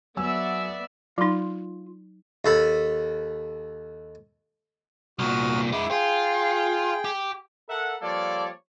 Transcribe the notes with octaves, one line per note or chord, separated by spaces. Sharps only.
F#3 B3 D5 E5 G#5 E6
F#3 D#4 F4 C6
D#2 A4 B5
C2 A#2 F#4 D#6 F6
G#3 E4 D6
F4 G#4 G5
G4
A4 A#4 E5 F#5
F3 G3 A#3 A4 C#5 D5